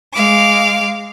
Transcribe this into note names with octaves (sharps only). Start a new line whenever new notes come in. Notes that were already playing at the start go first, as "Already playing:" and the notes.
G#3 F5 D6